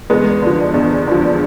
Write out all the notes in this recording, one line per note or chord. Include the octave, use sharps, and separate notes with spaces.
E2 G#3 B3
D3 F3
E2
D3 F3